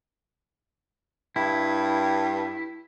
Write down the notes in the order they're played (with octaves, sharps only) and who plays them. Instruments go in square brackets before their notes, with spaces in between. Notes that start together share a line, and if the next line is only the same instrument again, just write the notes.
[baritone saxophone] G2 [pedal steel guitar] E4